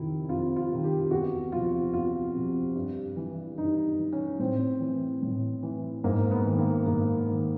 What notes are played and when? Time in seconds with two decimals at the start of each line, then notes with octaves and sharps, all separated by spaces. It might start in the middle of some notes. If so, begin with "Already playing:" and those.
Already playing: F2 C3 D#3 E4
0.29 F2 F4
0.56 F4
0.71 C3 D#3
0.84 G4
1.11 E2 F#4
1.52 C3 F3 F4
1.93 E2 F4
2.35 C3 F3
2.75 G2
3.16 E3
3.58 G2 D#4
3.99 E3
4.13 C#4
4.39 A2 C4
4.80 E3
5.22 A2
5.63 E3
6.04 G#2 A#3
6.31 B3
6.45 D#3
6.59 A#3
6.86 G#2 A#3
7.28 D#3